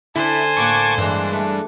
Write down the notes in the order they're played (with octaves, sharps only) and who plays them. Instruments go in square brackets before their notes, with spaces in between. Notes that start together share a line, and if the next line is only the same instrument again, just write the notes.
[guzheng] D3 [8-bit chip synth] E4 [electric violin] C5 [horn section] G#5 A5
[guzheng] A2 A#3 F#5 [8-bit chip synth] C#6 D6 G#6
[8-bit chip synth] G2 [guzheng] E3 G#3 [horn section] D4
[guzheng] A3